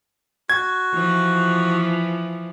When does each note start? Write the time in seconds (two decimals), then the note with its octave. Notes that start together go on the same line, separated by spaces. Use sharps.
0.50 F#4 G#6
0.94 E3 F3